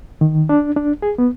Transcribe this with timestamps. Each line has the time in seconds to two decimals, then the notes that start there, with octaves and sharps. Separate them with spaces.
0.21 D#3
0.49 D4
0.76 D4
1.02 G#4
1.18 B3